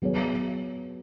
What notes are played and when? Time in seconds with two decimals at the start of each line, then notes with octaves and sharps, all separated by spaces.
0.02 F#3 B3 G#4 C#5